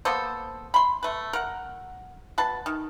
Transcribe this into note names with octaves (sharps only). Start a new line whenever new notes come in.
A#3 B3 A4 C5
B5 C6
A3 B4
A#4 F#5
B2 B4 A5
D#3